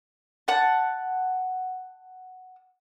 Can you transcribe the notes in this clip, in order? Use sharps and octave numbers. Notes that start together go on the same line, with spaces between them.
F#5 A5